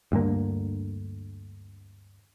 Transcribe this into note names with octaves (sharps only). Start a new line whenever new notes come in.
D2 G2 D3 A#3